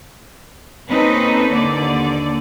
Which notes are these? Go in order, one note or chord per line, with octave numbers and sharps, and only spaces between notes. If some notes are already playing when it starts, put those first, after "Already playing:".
A#3 C4 C#4 D#4 A4 B4
D#2 D3 D5